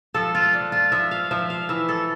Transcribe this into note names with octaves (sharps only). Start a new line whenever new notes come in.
F3 A4
F4
D4
F4
F3 E5
F5
F3 E5
F5
E3 E5
A4